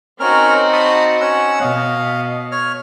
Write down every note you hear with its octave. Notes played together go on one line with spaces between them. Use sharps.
C4 C#4 D#4 F#4 A#4 F6
A5 B5 D#6
C#4 F#5 E6
B2 D#5 F5
C#5 F6